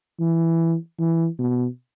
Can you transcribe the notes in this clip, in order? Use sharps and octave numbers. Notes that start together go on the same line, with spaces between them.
E3
E3
B2